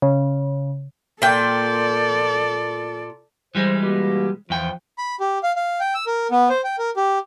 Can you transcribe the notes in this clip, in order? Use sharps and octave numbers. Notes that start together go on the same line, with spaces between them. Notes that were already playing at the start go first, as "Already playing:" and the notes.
C#3
A#2 A4 D5 G5
E3 G3 G#3 C5
B2 A#3 G4
E2 F3 G5
B5
G4
F5
F5
G5
E6
A#4
B3
C5
G5
A#4
G4